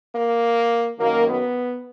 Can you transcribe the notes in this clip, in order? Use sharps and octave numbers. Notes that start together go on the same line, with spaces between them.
A#3
F#2 D#3 F#3 A#3
B3